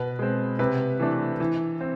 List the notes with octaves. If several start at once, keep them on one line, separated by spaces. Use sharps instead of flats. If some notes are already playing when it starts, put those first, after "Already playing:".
Already playing: B2 B4
G#3 C4
C3 B4
E3 A3 D4
E3
C4